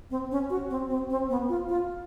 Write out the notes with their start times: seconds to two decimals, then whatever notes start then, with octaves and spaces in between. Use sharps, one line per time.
0.11 C4
0.31 C#4
0.50 F#4
0.70 C4
0.90 C4
1.10 C4
1.30 B3
1.49 F4
1.69 F4